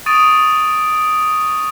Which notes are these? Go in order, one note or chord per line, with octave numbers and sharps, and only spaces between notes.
C#6 D#6 A6 D7 D#7 F7